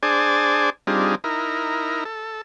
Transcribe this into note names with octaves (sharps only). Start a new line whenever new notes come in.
D4 G#4 C5 D5 G#5 A5
G3 C4 D4 D#4 F4 G#4
D#4 E4 A#4
A4